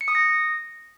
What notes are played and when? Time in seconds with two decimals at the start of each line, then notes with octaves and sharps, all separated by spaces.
0.01 C#7
0.08 D#6
0.15 A#6